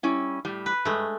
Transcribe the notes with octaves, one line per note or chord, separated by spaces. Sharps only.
G3 C#4 E4
A2 G3
B4
G2 G#3 A3